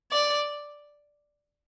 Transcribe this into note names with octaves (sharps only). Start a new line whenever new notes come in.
D5